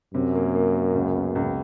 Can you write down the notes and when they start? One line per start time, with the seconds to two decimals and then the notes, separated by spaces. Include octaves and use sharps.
0.14 F#2 C3
0.35 A#3
0.55 A#3
0.75 A#3
0.94 C#2
1.16 B3
1.35 C#2